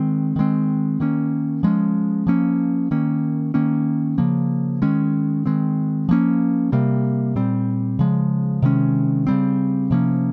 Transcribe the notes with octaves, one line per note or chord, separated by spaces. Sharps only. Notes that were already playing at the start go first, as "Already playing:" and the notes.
Already playing: D#3 G#3 C4
D#3 G#3 C4
D#3 A#3 C#4
F3 G#3 C#4
F3 A#3 C#4
D#3 A#3 C#4
D#3 A#3 C#4
C#3 F3 A#3
D#3 G#3 C#4
D#3 G#3 C4
F3 A#3 C#4
C3 G3 A#3
A#2 G3 C4
C#3 F3 G#3
C3 D#3 G#3 C#4
C#3 G3 C4
C3 F3 A#3 C#4